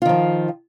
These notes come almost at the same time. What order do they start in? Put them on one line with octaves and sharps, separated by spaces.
F4 D#3 F3